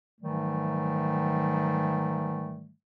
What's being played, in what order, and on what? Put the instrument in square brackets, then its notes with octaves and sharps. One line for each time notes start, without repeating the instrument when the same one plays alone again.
[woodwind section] G#2 D#3 E3 F#3 G3 A3